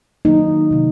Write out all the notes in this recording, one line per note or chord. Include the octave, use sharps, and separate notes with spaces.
D#3 F#3 A#3 D#4
C3 D#3 A#3